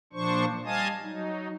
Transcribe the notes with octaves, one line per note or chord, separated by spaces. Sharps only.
A#2 F3 D4 C5 C#6
G3 D#5 F5 G#5 A5 D#6
F#3 D#4